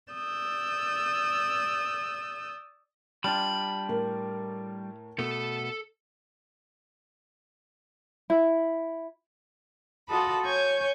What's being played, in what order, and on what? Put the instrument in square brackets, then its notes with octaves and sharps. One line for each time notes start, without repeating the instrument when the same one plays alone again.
[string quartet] D5 D#6 E6 G6
[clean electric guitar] G3 D4 F4 [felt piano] D5 [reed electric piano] G5 A5 F6 [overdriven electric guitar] B5
[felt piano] A2 A#4
[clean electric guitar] B2 A3 B3 [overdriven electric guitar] A4
[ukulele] E4
[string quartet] F4 F#4 A4 D#5 A5 B5
C#5 G#5 C#6 G6